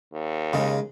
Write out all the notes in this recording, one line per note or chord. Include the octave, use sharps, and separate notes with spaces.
D#2
C#3 G#3